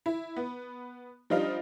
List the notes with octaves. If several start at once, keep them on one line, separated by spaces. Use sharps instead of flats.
E4
B3
F3 G3 D4 D#4 D#5 F5